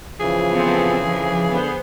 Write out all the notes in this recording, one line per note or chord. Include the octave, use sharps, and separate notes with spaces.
C#3 E3 F3 G#4
B3 C4 A4
F3
D3 B3 C5